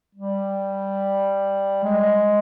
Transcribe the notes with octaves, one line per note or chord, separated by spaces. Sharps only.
G3
G#3